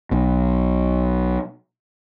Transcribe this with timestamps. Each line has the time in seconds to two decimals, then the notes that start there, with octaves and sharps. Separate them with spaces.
0.11 B1 B2